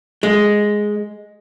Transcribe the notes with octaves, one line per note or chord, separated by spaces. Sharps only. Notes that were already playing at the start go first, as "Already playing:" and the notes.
G#3